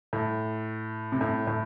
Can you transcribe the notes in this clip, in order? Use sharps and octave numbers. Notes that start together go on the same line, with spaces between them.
A2
C3
A2
A2